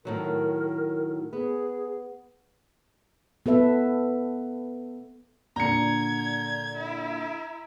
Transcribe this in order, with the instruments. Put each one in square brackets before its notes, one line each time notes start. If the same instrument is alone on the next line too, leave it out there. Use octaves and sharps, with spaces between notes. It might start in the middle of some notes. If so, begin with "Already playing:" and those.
[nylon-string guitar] A2 D#3 F#3 [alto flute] A#4
[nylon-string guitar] B3 [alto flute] G#4
[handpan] B3 A4 B4 E5
[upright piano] A#2 D3 [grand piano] A#5 C#7 [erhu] G#6
[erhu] E4